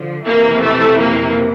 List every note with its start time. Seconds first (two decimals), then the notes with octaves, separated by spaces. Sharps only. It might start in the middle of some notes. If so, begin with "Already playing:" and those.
Already playing: D3 F3
0.25 F2 C3 E3 A#3
0.62 A3
1.00 A#3